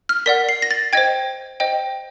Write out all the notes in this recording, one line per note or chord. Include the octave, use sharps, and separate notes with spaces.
F6
A#4 D5 F#5 B6
C7
A#6
A6
C5 D#5 G5 G#6
C5 D#5 G5